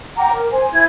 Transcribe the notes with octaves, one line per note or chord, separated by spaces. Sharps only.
F#5 G5 A#5 D6
A#4
C5 G#5
E4 G#6